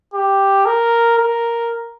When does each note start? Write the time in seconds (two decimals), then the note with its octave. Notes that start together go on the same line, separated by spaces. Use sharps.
0.14 G4
0.65 A#4
1.18 A#4